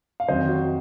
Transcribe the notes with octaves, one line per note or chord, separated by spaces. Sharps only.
F5
F2 D#3 F#3 C5 D#5
F#4